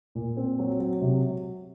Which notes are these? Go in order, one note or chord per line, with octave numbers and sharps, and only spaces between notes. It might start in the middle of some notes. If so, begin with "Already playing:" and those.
A#2
C4
F#3
F#3
C3